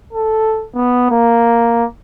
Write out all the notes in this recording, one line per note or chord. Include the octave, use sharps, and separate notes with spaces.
A4
B3
A#3